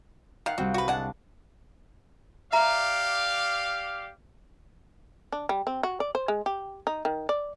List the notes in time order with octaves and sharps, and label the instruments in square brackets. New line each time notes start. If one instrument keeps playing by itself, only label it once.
[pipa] D#3 [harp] F5 F#5
[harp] C2 C4 [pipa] F#4
[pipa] F#4 B4
[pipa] G#3 F#5 [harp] D4 A5
[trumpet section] G4 D5 F5 [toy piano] E5 A#5
[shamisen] D4
G3
C4
F#4
D5
C5
G#3
G4
D#4
D#3
D5